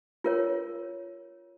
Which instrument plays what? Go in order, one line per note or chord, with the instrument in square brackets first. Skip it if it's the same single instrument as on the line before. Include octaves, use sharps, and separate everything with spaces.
[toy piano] F4 A#4 C#5